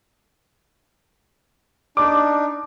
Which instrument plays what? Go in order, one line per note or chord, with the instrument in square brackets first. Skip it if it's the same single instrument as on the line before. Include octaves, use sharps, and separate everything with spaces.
[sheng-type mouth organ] D4 D#4 [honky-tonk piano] D6